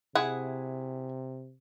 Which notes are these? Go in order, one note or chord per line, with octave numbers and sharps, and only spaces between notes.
C3 E4 G#4 F#5